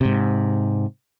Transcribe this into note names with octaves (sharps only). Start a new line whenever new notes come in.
G#2 C3